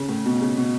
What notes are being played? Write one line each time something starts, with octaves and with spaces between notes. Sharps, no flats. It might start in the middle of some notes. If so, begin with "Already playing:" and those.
Already playing: C#3
A2
B2
C#3
B2